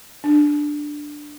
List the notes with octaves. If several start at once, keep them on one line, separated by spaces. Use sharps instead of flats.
D4